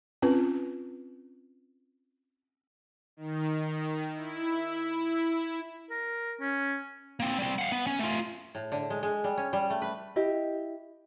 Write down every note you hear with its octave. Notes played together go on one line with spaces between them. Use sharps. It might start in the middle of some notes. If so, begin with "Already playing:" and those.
C4 C#4 F4 B4
D#3
E4
A#4
C#4
A#3 C4
G3 C4
F5 F#5
B3
C#4
A3 F4
A2
D3
G#3
G#3
G3
C#4
G3
A3
B4
E4 G4 D#5